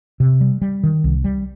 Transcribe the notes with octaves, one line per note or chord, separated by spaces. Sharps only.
C3
G3
G3
D#3
C2
G3